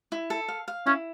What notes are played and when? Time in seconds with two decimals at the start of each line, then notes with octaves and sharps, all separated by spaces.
0.12 E4
0.30 A4
0.48 F5
0.68 F5
0.86 C#4 E4